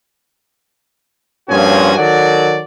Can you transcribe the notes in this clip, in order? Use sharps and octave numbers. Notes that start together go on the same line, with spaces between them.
G2 A#2 F3 C#4 F#4 G#5
D#3 F#3 F#4 A4 D5